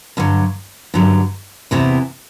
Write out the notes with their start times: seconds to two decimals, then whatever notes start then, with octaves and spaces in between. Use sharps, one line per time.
0.17 G2 D3 F#3
0.94 G2 D3 F#3
1.71 E2 C3 E3 B3